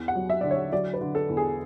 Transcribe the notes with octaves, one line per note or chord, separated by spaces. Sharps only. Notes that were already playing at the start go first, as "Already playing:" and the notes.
Already playing: E2
F#5
F#3
E5
D3 D5
C#5
F#3 D5
B4
D3
A4
E2
G#4